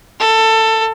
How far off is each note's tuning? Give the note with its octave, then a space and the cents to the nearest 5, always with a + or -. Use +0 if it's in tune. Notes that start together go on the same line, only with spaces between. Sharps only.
A4 +15